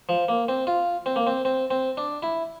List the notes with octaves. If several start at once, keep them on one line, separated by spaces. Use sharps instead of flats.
F3
A#3
C4
F4
C4
A#3
C4
C4
C4
D4
E4